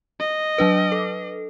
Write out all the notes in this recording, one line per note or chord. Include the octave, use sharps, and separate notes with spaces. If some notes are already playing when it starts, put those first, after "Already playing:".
D#5
F#3 D4 B4
A4